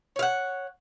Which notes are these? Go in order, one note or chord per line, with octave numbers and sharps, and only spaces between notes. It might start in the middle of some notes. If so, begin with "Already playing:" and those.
C#5 F5 F#5